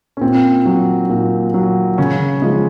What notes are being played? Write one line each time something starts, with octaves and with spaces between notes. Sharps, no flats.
C#4
A#2 C4
F#3
A#2
F#3
C#3 C#4
F3 G#3